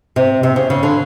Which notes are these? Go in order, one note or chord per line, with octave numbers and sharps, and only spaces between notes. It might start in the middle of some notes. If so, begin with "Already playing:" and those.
C3
C3
C#3
C#3
D3